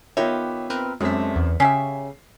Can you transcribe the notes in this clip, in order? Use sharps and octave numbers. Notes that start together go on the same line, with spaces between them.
D#3 B3 F4 G4 C#5 E5
C4 A#4 B4
F#2 G#3 A3 C4 D4 B6
E2
C#3 C#4 G4 E5 C7